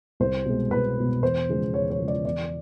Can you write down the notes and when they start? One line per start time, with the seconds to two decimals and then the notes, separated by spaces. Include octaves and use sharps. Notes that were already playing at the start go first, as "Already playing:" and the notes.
0.20 C2 C5
0.45 B2 G#3
0.71 C2 B4
0.97 B2 G#3
1.22 E2 C5
1.48 C#3 F3 G#3
1.74 E2 C#5
1.90 C#5
1.99 C#3 F3 G#3
2.08 D5
2.24 E2 D5